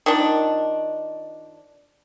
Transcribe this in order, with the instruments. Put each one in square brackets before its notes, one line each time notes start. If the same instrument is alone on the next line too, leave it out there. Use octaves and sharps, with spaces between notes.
[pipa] D#3 F3 D4